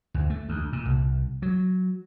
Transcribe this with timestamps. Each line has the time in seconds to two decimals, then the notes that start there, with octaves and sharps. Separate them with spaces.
0.14 D2
0.30 A3
0.49 D2
0.73 A#2
0.85 C2
1.42 F#3